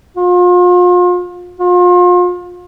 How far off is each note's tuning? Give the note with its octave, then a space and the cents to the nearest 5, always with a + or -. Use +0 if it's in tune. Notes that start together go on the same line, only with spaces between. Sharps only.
F4 +35
F4 +35